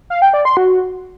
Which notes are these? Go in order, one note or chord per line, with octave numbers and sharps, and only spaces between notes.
F5
G5
D5
C6
F#4